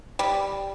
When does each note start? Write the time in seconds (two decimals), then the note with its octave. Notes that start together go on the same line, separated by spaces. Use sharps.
0.19 G3